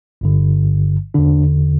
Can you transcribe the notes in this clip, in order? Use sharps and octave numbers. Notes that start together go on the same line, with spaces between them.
G1 G2 D3
E2 D3 D4